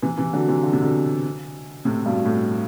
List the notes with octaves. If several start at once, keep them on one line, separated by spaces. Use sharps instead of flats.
C3 E3
C3 E3
D3 F#3
C3 E3
D3
C3
B2 D3
A2 C3
G2 B2
A2